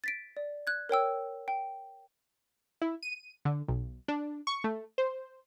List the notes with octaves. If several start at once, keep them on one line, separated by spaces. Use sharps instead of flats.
A6 B6 D7
D5
F#6 G#6
A#4 C#5 G5 E6
G5
E4
D#7
D3
B1
D4
C#6
A3
C5